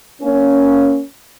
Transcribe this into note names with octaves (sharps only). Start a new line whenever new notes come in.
A#3 C#4